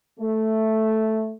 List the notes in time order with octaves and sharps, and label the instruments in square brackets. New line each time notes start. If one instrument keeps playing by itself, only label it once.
[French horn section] A3